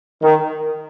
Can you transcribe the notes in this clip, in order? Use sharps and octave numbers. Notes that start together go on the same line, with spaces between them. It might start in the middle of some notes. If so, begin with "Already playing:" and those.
D#3